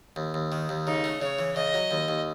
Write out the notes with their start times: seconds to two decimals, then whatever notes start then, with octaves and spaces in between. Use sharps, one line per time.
0.16 D#2
0.34 D#2
0.52 D#3
0.69 D#2
0.87 C#3 D#4
1.04 A3
1.21 C#3 C#5
1.39 E3
1.56 C#3 D#5
1.74 F#3
1.91 D#2
2.08 D#2